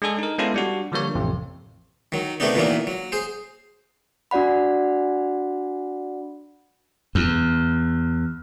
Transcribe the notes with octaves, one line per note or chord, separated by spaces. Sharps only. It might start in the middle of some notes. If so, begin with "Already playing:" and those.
G#3 D4 G#4 A4
D#4 A#4
G#3 B3 C#4 E4 F4 A4
G3 D4 F#4
D3 F3 G3 A#3 C#5
A1 F2 C3
D#3 F#3
C3 D#3 A3 B3 D4 D#4
A#2 D#3 E3 F#3 A#3 B3
F#3
G#4 C5
D4 F#4 D5 F#5 B5
E2